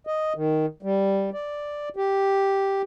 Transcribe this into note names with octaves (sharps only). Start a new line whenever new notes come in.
D#5
D#3
G3
D5
G4